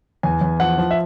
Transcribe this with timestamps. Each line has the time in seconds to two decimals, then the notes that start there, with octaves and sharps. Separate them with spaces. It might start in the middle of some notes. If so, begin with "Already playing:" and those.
0.23 E2 G#5
0.41 E2
0.60 F3 F#5
0.78 F3
0.91 E5